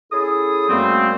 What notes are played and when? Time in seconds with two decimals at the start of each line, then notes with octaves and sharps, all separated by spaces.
0.12 C#4 E4 G#4 A4 D#6
0.69 F#2 G3 A3 A#3 C4